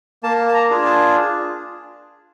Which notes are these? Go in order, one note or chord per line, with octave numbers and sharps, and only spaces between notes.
A#3 A5
A5
A#5
D4 F4 G#4
A5